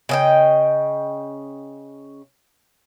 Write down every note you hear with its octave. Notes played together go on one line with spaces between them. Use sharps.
C#3 D#5 G5